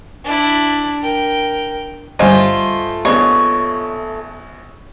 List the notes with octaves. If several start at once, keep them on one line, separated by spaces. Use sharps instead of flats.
D4 E4
A#4 G5
G1 G3 A3 F4 C5 D#5 G#5
A#1 B3 C#5 D#5